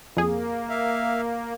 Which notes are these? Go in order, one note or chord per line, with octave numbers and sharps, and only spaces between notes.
F2 A#3 G#4
E5 F5